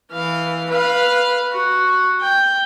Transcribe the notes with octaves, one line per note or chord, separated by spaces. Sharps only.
E3 F5
B4 F5
F#4
G5